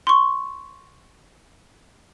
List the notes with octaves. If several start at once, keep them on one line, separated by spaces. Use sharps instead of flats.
C6 C#6